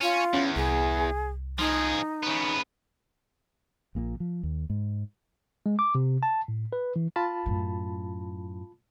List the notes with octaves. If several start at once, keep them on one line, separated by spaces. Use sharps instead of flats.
C#4 F4
E2 C#4
C2 G#4
F3 D#4 G#4
C#3 B3
A#1 A#2 D3 A#3
F3
D#2
G#2
G#3
D6
C3
A5
A2
B4
E3
F4 A5 B5
F#2 A2